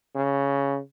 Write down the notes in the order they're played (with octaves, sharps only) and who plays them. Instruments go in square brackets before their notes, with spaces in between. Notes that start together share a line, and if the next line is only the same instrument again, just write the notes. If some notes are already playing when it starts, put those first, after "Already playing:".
[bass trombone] C#3